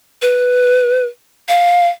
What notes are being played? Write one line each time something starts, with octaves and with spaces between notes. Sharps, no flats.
B4
F5